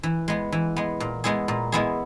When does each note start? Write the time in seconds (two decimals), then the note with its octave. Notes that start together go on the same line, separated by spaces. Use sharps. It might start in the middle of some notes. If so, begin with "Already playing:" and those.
0.03 E3
0.28 G#3 B3
0.52 E3
0.76 G#3 B3
1.00 A#2
1.24 G#3 B3 E4 G#4
1.48 A#2
1.72 G#3 B3 E4 G#4